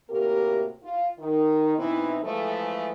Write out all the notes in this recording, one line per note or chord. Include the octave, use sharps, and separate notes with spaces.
A2 C3 A#3 F#4 G4 A#4
F4
D#3
B2 E3 C4 D#4 E4
E3 F3 G#3 A3